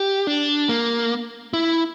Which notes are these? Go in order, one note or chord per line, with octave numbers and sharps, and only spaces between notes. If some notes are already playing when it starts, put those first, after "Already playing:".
Already playing: G4
D4
A#3
E4